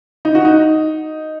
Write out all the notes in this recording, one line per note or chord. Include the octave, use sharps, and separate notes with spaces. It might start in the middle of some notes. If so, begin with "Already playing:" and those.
D#4
F#4
D#4